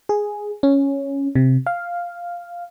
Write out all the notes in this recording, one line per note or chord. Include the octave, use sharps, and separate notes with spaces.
G#4
C#4
C3
F5